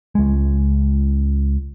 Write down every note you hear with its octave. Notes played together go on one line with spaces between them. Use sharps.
C#2 G#3